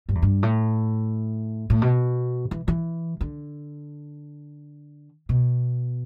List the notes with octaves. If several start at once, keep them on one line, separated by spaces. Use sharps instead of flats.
G2
E2
G2
A2
A2
B2
E3
E3
D3
B2